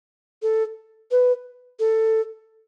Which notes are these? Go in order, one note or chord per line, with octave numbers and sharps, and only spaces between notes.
A4
B4
A4